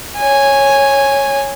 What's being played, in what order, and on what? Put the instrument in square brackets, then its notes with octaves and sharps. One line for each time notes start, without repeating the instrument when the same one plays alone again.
[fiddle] C#5 G#5